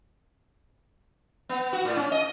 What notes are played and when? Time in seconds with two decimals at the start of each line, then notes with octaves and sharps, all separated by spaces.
1.49 B3
1.73 F#4
1.85 A2
1.96 C#4
2.12 D#5